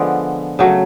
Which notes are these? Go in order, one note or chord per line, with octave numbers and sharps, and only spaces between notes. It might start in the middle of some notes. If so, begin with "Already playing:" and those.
Already playing: D3 F3 G#3 B3 D5
C#3 F#3 A3